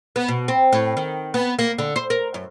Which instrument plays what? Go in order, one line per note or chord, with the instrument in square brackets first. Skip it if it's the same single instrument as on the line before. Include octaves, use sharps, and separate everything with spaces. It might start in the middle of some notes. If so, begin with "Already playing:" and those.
[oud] B3
B2
C4
A2
D#3
B3
A#3
D3
C5
A#4
F#2